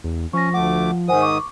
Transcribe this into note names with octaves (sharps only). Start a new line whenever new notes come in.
E2
F3 C#4 C#6 A#6
D2 A3 F#5 D6
G#2 D#3 C5 F#5 G#5 D#6
C#6 D6